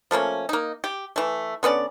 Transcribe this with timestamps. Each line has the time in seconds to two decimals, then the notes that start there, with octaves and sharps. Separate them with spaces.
0.11 F3 A3 A#3 C#4
0.49 A#3 D#4
0.84 G4
1.16 E3 A3
1.63 D3 B3 C#4 D5